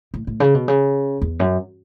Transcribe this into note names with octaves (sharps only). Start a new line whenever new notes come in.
A2
A2
C#3
B2
C#3
E2
F#2